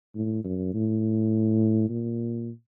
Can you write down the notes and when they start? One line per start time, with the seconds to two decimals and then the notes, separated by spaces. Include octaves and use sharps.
0.15 A2
0.44 F#2
0.74 A2
1.89 A#2